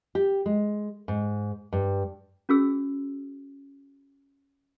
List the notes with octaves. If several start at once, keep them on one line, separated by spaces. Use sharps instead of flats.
G4
G#3
G#2
G2
C#4 F#4 G#4 E6